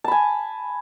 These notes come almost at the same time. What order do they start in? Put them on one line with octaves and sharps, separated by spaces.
A5 B5 G#5